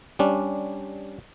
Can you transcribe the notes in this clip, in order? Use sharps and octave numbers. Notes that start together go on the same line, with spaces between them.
G3 C#4 D4